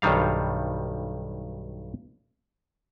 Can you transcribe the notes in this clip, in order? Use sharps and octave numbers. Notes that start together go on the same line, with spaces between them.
B1 G2 D#3 G3 F5